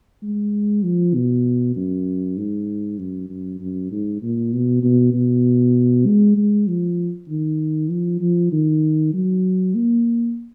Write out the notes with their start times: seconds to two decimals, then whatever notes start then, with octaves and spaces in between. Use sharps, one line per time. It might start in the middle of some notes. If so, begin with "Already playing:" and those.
0.22 G#3
0.84 F3
1.14 B2
1.76 F#2
2.37 G#2
2.98 F#2
3.30 F#2
3.60 F#2
3.91 G#2
4.22 A#2
4.53 B2
4.83 B2
5.13 B2
6.06 G#3
6.37 G#3
6.68 F3
7.29 D#3
7.90 F3
8.21 F3
8.52 D#3
9.13 F#3
9.75 A#3